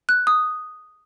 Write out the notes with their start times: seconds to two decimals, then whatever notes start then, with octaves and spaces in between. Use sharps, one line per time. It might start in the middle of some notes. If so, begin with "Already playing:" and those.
0.09 F#6
0.27 D#6